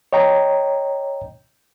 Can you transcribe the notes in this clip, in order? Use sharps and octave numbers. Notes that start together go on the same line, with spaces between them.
C#5 D#5 G5 A#5